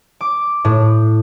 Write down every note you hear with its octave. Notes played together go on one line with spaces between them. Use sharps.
D6
A2